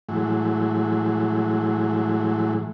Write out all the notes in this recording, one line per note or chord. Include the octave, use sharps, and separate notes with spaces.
A2 E3 F#3 G#3